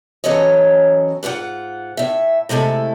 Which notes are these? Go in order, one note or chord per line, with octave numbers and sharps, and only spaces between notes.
E3 F#3 C#4 A4 C#5 D#5
G#2 F4 B4 F#5
A2 E5
C3 G#3 A3 E4 A4